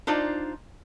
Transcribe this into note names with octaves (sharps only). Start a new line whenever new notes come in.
D4 D#4 F4 C5 D5 A#5